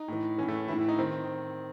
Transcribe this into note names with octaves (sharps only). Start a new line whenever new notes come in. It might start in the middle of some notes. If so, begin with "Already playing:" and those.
Already playing: D#4
A2 E3
A2 E3 C#4
A3
A2 E3 E4
E4
D#4
D#3 C4